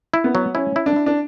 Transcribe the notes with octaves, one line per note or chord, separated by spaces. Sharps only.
E4
B3
F#3
C#4 E4
E4
D4
E4
D4